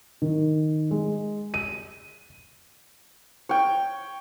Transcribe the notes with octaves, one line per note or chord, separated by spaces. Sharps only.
D#3
G#3
D#7
C#5 G5